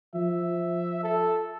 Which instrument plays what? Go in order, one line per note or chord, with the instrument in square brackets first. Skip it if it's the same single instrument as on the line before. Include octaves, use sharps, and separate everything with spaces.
[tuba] F3 [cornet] E5
[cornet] A4